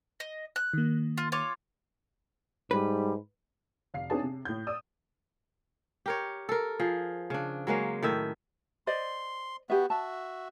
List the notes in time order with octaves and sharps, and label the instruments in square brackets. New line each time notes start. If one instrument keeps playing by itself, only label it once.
[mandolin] D#5
F#6
[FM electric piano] D#3 A#3
[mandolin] F4
F4 C#5 D6
[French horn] G#2 [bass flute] G3 [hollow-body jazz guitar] B4
[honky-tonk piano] F1 F5 C7
C4 D4 D#4 G#4 C#5 A5
C3
A2 G6
D5 D#6 E6
[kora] G4 A#4 C#5
A4 A#4
F3 G#4
C#3 D4
F#3 G#3 A#3 C#4
A2 D#3 E5
[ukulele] C5 D5 D#5 [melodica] C6
[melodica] B3 F#4 [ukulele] G4 E5
[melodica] F#4 E5 [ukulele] A5